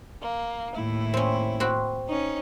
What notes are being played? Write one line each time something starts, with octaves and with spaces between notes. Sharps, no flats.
A#3
D#2 A2 E4
C4 C#4
C4 F#4 B5
C#4 D#4